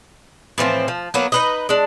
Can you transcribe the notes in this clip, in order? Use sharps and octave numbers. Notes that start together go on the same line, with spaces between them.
A2 E3 F3 C4
F3
F#3 A#3 B3
D#4 B4 D#5
G#3 D4